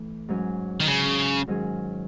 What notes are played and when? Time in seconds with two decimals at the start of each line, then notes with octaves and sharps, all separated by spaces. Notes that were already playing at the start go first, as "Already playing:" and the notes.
Already playing: E3 A3
0.29 G#2 F#3 C#4 G#4
0.80 D#3
0.87 C#3
1.47 G#2 D#3 F#3 C#4 G#4